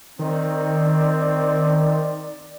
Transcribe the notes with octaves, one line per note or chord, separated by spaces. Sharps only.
D#3 C4 D5